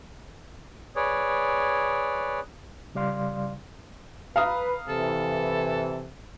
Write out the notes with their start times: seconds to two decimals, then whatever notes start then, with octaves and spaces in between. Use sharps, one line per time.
0.96 G#4 B4 C#5 D5
2.95 C#3 G3 D5 F5 C6
4.36 B4 F5 A#5 D#6
4.89 C3 E3 A4